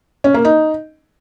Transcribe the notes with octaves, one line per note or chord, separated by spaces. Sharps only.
C#4
A#3
D#4